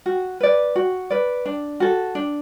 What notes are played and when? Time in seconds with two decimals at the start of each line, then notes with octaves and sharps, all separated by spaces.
0.06 F#4
0.40 B4 D5
0.76 F#4
1.10 B4 D5
1.46 D4
1.80 F#4 A4
2.15 D4